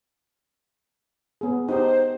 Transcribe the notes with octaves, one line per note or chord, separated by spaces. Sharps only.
B3 G#4
D#4 G4 C5